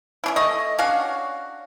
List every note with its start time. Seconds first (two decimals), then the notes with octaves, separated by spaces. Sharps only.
0.24 C#4 D4 E4
0.36 A3 D#5
0.79 C#4 D4 F#4 F5